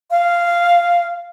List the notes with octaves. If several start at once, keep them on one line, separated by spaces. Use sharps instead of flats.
F5